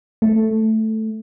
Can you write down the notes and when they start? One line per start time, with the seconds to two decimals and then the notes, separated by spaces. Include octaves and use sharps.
0.22 A3